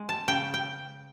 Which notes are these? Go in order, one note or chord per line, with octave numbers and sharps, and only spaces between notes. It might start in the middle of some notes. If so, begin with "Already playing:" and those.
Already playing: G#3
A5
C#3 G5
G5